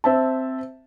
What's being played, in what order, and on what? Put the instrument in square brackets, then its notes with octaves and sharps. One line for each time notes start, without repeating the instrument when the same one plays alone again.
[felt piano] C4 E5 A5